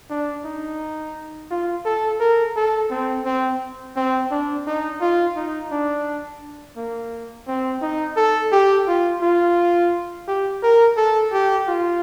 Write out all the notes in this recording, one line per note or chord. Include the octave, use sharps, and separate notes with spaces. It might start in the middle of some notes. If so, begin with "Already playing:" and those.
D4
D#4
F4
A4
A#4
A4
C4
C4
C4
D4
D#4
F4
D#4
D4
A#3
C4
D#4
A4
G4
F4
F4
G4
A#4
A4
G4
F4